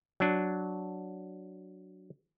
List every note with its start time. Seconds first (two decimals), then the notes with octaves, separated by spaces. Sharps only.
0.20 F#3 D4